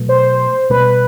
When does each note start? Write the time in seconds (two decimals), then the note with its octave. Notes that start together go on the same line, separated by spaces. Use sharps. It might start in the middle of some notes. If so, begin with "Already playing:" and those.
Already playing: B2 F#3 A3
0.09 C5
0.70 B2 G3 B3 B4